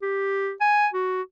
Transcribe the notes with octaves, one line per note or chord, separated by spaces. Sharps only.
G4
G#5
F#4